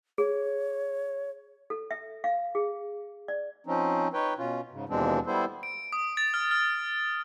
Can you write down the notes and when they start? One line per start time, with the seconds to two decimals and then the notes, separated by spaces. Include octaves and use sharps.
0.18 G#4 C#5
1.70 A4
1.91 E5
2.24 F5
2.55 G#4
3.28 D5
3.67 F3 C4 C#4 D#4
4.14 D#4 B4 C#5 G5
4.38 B2 C#4 F4
4.71 G#2 C#3
4.89 D#2 B2 E3 G#3 C4 D4
5.26 G3 B3 E4 A4 C5
5.63 D7
5.92 D#6
6.17 A6
6.34 F6
6.51 F6